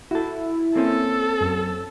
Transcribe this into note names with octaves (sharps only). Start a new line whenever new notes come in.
E4 F#4 A4
A#3 C4 C#4 A4
F#2